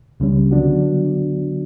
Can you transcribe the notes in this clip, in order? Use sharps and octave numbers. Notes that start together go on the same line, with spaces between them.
C#2 C#3 G3 C#4
D3 F#3 B3 D4 F#4